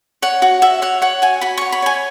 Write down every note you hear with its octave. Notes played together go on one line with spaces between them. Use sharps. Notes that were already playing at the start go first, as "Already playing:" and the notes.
C#5 F#5
F#4
F#4 E5
C#5 F#5
C#5 F#5
F#4 G#5
F#4 B5
C#5 C#6
B5
C#5 G#5